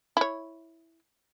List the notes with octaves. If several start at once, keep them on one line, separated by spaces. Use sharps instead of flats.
E4 C#5